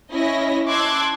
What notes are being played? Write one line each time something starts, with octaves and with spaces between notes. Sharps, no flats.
C#4 E4 D#5 A#6
A5 C6 D6 E6 F#6 G#6